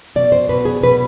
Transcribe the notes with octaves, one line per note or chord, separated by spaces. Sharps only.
B2 D5
C5
B2 B4
G#4
B2 B4